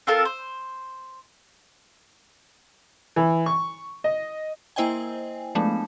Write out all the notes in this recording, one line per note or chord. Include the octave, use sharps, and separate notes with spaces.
C4 F4 A4 A#4
C5
E3
C#6
D#5
A#3 E4 C5 D#5 G5 G#5
F3 G#3 A3 B3 D4